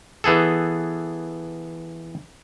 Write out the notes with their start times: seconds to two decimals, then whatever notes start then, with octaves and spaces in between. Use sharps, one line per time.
0.24 E3 B3 G#4 A4